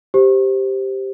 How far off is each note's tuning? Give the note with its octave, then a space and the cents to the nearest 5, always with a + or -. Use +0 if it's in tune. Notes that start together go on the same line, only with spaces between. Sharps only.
G4 +0 C5 +0